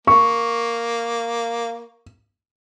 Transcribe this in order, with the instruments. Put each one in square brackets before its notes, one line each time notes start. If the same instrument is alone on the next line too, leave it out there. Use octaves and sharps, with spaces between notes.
[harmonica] A#3 [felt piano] C#6